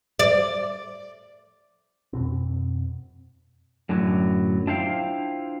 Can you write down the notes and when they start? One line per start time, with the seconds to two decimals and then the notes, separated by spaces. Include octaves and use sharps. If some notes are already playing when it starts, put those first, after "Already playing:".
0.19 D5
2.13 F2 B2 C4
3.89 F#2 A2 D3 F#3
4.67 D4 E4 F4 C5 F5 G5